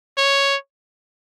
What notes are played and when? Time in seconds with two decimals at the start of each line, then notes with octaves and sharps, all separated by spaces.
0.18 C#5